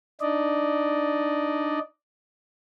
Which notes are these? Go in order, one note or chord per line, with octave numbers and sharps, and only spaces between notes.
D4 D#4 D5 D#5